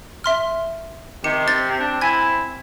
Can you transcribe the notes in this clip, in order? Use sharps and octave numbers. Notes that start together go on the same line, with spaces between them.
E5 C6 F6
C3 D#3 G4 C#7
C4 A6
D4
E4 G#5 G#6